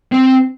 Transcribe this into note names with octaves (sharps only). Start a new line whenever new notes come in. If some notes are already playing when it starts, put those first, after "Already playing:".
C4